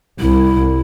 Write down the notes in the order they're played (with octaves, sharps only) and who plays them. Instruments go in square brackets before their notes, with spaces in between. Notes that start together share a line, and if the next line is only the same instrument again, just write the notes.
[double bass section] C2 [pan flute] E4